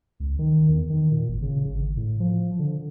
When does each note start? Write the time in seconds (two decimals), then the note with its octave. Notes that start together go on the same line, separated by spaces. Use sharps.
0.20 C#2
0.39 D#3
0.69 E2
0.90 D#3
1.11 A#2
1.28 G1
1.42 C#3
1.65 G#1
1.97 A2
2.20 F3
2.59 D3